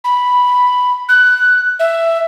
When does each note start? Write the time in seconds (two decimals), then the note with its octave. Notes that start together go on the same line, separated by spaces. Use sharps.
0.04 B5
1.09 F#6
1.79 E5